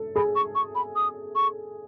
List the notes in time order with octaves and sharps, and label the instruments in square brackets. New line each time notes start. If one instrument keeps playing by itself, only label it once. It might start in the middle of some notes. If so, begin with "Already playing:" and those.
Already playing: [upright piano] A4
[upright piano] G#4 [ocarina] B5
[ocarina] C#6
C#6
B5
D#6
C#6